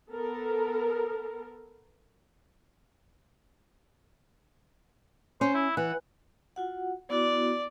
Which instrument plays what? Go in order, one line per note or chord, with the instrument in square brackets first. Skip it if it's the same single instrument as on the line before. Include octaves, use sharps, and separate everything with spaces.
[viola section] B3 A4 A#4
[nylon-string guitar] C#4 [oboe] C5
[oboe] E4
[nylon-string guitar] E3 [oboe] F#5
[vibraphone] F4 F#4 F#5
[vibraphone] B3 E4 F#4 [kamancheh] D5